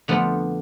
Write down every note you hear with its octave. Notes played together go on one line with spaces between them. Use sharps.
F2 D3 F3 A3 B3